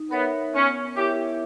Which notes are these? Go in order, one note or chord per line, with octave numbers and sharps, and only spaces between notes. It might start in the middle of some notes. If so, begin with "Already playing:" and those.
Already playing: D#4
B3 A#4 C#5 E5
B3 C#4
E4 G4 A#4 C#5 E5